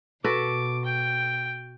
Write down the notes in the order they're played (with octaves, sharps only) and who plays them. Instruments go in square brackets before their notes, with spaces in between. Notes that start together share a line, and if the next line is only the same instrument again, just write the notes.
[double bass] B2 [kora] F#4 A4 B4 [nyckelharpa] D6
[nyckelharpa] G5